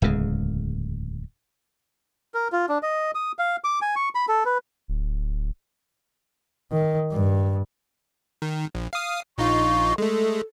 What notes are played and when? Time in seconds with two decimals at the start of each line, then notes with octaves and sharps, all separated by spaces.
0.02 D1 E2 C#3 G#3
2.34 A#4
2.52 F4
2.69 D4
2.83 D#5
3.15 D#6
3.39 F5
3.64 D6
3.82 G#5
3.96 C#6
4.15 B5
4.28 A4
4.46 B4
4.88 D1
6.72 D#3
7.12 G2
8.42 D#3
8.75 A#1
8.93 F5 D#6
9.38 A#1 D#4 F4 C#6
9.98 G#3 A3 A4